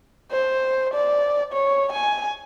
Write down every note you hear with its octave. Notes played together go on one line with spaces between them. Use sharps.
C5
D5
C#5
G#5